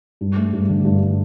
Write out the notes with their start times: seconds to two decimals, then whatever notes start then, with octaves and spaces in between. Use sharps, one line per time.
0.21 G2
0.36 A3
0.53 G2
0.69 D3
0.85 G2